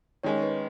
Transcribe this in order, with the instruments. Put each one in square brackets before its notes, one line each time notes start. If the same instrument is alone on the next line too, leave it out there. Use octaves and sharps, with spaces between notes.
[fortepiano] D#3 G#3 C#4 [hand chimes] C#5
[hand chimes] B4